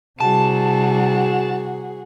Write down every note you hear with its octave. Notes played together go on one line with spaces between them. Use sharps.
C3 G3 E4 F#4 G#4 A5